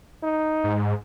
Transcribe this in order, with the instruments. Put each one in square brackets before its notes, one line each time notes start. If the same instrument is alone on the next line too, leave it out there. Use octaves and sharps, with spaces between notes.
[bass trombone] D#4
[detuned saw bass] G#2